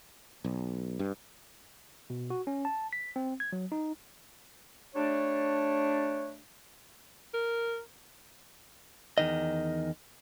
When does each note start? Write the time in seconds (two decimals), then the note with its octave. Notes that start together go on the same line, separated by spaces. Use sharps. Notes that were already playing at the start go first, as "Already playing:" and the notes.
0.44 B1
0.99 G2
2.10 B2
2.30 F#4
2.47 C#4
2.65 A5
2.93 B6
3.16 C4
3.40 G#6
3.53 F#3
3.72 D#4
4.95 G3 A3 D4 C#5
7.34 A#4
9.18 E2 D#3 D#5